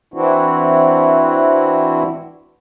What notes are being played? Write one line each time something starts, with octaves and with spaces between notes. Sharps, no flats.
E3 C4 D4 E4 F#4